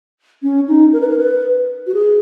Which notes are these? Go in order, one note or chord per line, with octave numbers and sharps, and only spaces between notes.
C#4
D#4
A#4
B4
A#4
B4
F#4
G#4